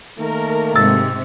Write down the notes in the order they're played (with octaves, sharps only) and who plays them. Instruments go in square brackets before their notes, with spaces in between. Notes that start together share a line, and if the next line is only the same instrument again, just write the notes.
[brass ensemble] D#3 A3 A#3 [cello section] A#4
[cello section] G#2 C3 [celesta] E6 A6